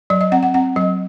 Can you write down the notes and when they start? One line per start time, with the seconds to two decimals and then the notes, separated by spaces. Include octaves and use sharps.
0.10 F#3 D5
0.21 D#5
0.32 C4 F#5
0.43 F#5
0.54 C4 F#5
0.76 F#3 D#5